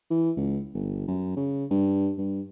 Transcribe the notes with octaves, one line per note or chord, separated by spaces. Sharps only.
E3
C#2
G1
F#2
C#3
G2
G2